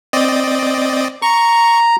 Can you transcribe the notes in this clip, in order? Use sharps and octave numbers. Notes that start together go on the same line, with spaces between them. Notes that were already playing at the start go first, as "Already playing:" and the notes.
C4 D5 D#5
A#5 C#6